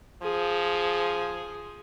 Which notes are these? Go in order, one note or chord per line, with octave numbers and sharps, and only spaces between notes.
F3 G#4